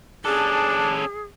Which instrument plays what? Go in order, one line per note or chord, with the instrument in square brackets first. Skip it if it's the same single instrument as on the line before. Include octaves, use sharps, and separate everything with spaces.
[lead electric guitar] C#4 A4 [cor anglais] D4 [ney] G#4